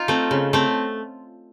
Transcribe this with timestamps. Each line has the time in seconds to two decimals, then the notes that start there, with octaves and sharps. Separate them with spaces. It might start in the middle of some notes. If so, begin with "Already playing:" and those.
Already playing: D#4 F4
0.08 A3 C4
0.31 C#3
0.53 A3 C4